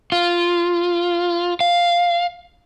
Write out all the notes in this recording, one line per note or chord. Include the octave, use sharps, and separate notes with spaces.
F4
F5